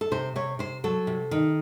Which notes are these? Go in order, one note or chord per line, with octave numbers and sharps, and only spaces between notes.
A4
C3 C5
C3 C#5
C3 C5
F#3 A4
C3
D#3